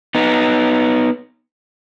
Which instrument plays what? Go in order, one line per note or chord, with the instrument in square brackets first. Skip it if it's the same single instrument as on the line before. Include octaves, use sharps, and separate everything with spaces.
[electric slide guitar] B3 D#4